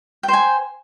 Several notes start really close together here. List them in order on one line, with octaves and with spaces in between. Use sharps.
G5 C5 G#5